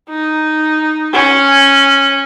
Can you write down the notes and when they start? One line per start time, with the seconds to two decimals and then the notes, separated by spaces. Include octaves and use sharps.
0.09 D#4
1.13 C#4